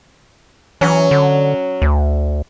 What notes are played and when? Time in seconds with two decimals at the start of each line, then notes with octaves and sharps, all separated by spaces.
0.81 E3 F#3 C#4
1.11 D3
1.82 D2